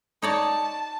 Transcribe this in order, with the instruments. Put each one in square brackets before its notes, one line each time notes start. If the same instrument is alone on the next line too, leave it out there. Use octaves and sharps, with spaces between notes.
[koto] D#4 C#5 D5 [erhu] A5